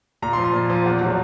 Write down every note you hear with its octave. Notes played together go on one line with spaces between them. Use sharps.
A#2 A#5
C6
F3
C6
A#2
F3
E2
B2 F#3